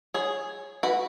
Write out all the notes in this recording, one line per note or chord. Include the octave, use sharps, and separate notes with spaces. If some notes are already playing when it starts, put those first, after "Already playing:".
G#4 C#5
F#4 B4